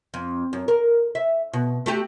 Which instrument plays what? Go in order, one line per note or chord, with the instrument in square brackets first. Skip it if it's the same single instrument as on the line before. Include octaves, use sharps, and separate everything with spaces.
[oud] F2
F#2
A#4
E5
B2
A3 F#4 G4